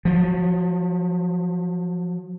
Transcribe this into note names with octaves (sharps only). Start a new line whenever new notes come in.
F3 F#3